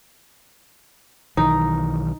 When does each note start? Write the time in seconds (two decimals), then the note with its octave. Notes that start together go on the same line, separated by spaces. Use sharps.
1.37 B1 D#3 E3 D#4